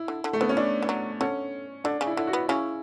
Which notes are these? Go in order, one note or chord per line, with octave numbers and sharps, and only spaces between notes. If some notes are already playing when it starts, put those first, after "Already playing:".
Already playing: E4
D3
D3
A3
D3 B3
C#4
E3 D4
E3
F#3
D3 C#4
D3 D4
C#3
E4
D3 E4
F#4
B3
C#3 C#4 E4